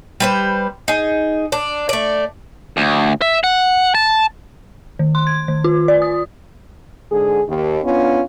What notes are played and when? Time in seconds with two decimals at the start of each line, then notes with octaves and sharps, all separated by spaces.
0.20 G3 B4 C5
0.88 D#4 G#4
1.52 D4
1.89 A3 D5
2.77 D2
3.22 E5
3.44 F#5
3.95 A5
4.99 D#3
5.15 C6
5.27 G#6
5.48 D#3
5.64 F4
5.88 D5
6.02 D#6
7.10 G#2 D3 G#4
7.47 D#2 D#3
7.84 B3 C#4 D4 F4